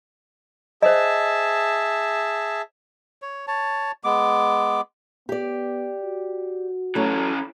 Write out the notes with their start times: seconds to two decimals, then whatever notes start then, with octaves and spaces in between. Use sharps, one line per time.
0.82 G#4 C5 D#5 E5 A5
3.22 C#5
3.48 C#5 A5
4.04 G#3 B3 D6
5.29 B3 G4 D5
6.03 F#4
6.95 E3 F#3 A3 C#4